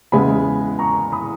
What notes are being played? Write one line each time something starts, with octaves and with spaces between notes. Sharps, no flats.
E2 C#3 G#3 B3 E4 G#5 B5
A#5 C#6
B5 D#6